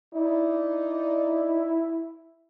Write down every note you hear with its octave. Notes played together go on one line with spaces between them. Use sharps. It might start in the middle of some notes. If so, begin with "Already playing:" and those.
D#4 E4 D5